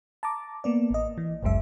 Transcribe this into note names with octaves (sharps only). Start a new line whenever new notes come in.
A5 A#5 D6
A#3 B3 D5
A1 D#5
E3
G1 C#2 F#2 G#3 E5